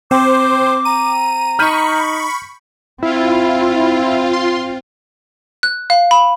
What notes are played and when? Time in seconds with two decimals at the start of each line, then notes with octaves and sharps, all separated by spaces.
0.11 C4 C5 G5 D6
0.85 A#5 D#7
1.59 D#4 B5 C#6 F6 G6 D#7
3.03 C4 E4 F4
4.33 C6
5.63 F#6
5.90 F5
6.11 B5